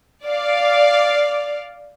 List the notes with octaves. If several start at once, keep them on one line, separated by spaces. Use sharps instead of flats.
D5 F5